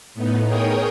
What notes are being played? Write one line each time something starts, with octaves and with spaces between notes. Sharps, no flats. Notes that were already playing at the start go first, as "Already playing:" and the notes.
A2 B3 D#4
G#4 A#4 C#5 G5 D#6